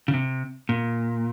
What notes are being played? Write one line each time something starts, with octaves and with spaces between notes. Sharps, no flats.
C#3
C3
A#2